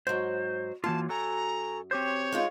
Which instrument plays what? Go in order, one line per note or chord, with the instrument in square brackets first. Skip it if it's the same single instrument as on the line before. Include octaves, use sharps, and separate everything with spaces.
[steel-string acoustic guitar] G#2 F#3 [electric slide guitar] C5
[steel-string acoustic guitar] F#2 [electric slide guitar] E3 A#3 F4 [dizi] A5
[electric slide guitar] F#4 A4 G#5 [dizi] A#5
[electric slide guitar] C4 G4 C5 [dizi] C#5
[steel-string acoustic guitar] G#3 D#4 F4